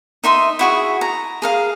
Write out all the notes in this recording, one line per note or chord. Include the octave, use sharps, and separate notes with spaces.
D#4 E5 C6 D#6
E4 F#4 G#4
A#5
G#4 A#4 F5